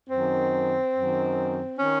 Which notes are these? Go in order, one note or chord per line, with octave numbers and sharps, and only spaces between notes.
F#2 D#3 C4
F#2 D#3
D#3 C#4